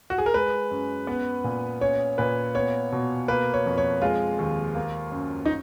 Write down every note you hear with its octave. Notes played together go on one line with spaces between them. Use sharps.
F#4
G#4
A#4
G#3 B4
F#2
B3
A#2
C#4 C#5
A#2 B4
B3 C#5
B2
A#3 B4
C#5
F2
C#5
G#3 F4
D#2
A#3
F#2
D#4